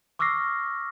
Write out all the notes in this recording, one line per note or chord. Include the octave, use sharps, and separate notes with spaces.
C#6 D6 E6 F6 A#6 C7